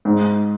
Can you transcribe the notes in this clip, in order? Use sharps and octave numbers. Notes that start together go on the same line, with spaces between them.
G#2